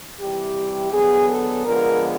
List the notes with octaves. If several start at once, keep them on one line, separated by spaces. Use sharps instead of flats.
C3 E3 G3 G4
D3 F#3 B3 G#4
A4
D3 F3 G#3 B3 A#4